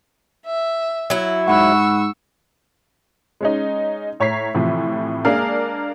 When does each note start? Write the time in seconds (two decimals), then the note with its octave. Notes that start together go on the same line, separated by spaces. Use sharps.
0.46 E5
1.10 F#3 E4
1.48 G#2 F#5 B5 C#6 E6 F#6
3.41 G#3 C#4 D#4
4.20 A2 C#5 A#5 C#6 B6 C7
4.55 A2 C3 E3 F3
5.25 G#3 A#3 D4 G#4 A#4 F5